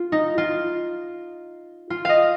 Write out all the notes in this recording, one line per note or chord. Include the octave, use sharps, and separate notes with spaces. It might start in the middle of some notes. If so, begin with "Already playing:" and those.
Already playing: F4
D#4
F4
F4
D#5 F5